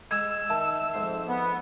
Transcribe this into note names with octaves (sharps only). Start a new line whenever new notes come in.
G#3 E6 G#6
D#3 E5 A5
F2 G#2 C6
B3